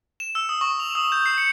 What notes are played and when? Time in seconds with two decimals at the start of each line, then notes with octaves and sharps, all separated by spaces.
0.20 E7
0.35 E6
0.49 D#6
0.61 C#6
0.80 F7
0.95 D#6
1.12 G6
1.26 C7
1.38 C#7